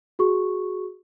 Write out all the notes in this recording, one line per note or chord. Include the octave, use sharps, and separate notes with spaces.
F#4 G#4 C#6